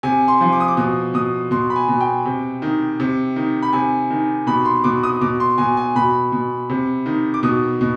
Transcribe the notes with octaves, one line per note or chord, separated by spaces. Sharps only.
C3 G#5
C6
F3
D6
D#6
D6
B2 D#6
B2 D#6
B2 C6
B5
G#5
B2
G5
C3
D#3
C3
D#3
B5
C3 G#5
D#3
B2 B5
C6
B2 D6
D#6
B2 D6
C6
B2 G#5
G#5
B2 B5
B2
C3
D#3
D6
B2 D#6
B2